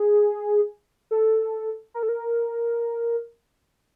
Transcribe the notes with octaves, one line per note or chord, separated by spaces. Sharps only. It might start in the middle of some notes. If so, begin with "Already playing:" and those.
Already playing: G#4
A4
A#4
A4
A#4